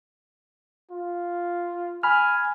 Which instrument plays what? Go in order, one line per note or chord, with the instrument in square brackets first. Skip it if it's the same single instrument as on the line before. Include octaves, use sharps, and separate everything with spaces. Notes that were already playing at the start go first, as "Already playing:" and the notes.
[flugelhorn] F4
[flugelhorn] G#5 [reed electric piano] B5 F6